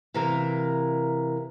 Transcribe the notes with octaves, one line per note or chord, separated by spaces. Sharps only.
C3 E3 A#3 A#4